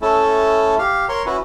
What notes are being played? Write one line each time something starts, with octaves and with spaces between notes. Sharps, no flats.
A3 C#4 E4 A4
G4 F5
A#4 C#5 C6
C#4 E4 F#4 B4